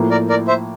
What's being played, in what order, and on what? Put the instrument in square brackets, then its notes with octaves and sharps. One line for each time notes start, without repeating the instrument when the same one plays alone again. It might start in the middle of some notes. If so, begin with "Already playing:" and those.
Already playing: [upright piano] A2 F3 A#3
[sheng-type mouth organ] A#4 D5
A#4 D5
C5 E5